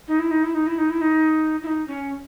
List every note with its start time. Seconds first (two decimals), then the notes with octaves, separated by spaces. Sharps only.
0.08 D#4
0.19 E4
0.31 D#4
0.43 E4
0.55 D#4
0.67 E4
0.78 D#4
0.90 E4
1.01 D#4
1.63 E4
1.67 D#4
1.87 C#4